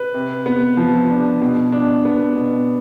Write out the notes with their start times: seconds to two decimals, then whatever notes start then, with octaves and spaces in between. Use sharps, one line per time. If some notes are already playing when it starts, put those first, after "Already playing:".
Already playing: B4
0.14 C3
0.46 B3
0.77 F3
1.10 D4
1.42 B2
1.72 D4
2.05 B3
2.36 B2